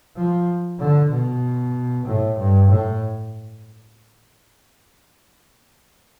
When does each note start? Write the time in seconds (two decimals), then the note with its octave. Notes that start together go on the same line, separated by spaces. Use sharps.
0.16 F3
0.80 D3
1.10 B2
2.06 A2
2.38 G2
2.70 A2